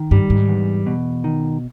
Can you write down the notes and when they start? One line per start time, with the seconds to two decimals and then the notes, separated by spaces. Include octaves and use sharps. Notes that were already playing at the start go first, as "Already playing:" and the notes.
Already playing: D#3
0.11 G2 G3
0.30 G#2
0.48 E2
0.86 B2
1.24 D#3